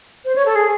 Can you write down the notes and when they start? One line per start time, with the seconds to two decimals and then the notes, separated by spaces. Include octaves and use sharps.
0.25 C5
0.36 C#5
0.46 A4
0.55 G#4